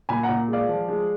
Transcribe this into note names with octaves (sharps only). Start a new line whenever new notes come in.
A#2 G#5 B5
F#5 A#5
A#2
G#3
D5 F5
F3
G#3